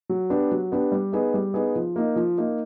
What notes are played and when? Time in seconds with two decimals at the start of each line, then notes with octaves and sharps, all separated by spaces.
0.09 F#3
0.30 B3 D4 G4
0.51 F#3
0.72 B3 D4 G4
0.92 G3
1.12 B3 D#4 G#4
1.34 G3
1.54 B3 D#4 G#4
1.76 F3
1.96 A#3 D#4
2.16 F3
2.38 A#3 D#4